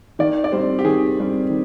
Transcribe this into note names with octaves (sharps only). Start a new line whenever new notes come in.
D#3 D5
D5
G3 C4 C5
G4
D#3 G#4
G3 C4
D#3